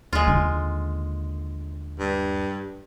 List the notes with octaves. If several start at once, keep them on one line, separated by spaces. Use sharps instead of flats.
D#2 G#3 F4
D3
G2